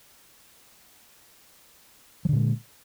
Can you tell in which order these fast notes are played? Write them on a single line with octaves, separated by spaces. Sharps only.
F3 D3 A#2 G#3